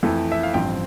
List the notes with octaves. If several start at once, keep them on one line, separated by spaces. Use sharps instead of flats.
F2 E3 A3
E5
F5
A1 G2 F3 C4 G5